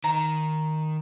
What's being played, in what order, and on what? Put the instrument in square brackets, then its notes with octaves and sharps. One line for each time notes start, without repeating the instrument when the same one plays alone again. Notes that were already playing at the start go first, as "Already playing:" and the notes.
[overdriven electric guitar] D#3 [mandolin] A#5